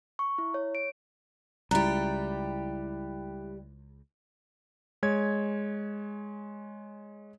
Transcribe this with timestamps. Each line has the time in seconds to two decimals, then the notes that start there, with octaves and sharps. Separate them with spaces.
0.19 C#6
0.38 E4
0.54 C#5
0.75 D7
1.71 C#2 G3 E4 G4 A#5 F#6
5.03 G#3 C#5 G#6